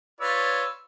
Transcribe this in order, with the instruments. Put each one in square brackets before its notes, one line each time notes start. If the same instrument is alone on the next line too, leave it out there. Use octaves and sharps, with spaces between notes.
[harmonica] F4 B4 D5 [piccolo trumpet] C#5 [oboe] E6